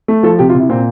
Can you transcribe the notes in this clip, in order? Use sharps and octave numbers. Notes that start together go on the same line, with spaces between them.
A3
F3 A4
C3 G4
F4
C3
E4
A#2 C4